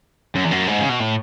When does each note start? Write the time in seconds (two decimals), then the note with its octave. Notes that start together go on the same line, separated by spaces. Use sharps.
0.35 F#2
0.44 E2
0.51 F#2
0.68 G#2
0.80 C#3
0.89 B2
1.00 A2